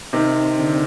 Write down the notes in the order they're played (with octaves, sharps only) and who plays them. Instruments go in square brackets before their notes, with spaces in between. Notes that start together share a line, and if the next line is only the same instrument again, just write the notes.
[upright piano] C3 D#3 [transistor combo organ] C4
[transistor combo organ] D3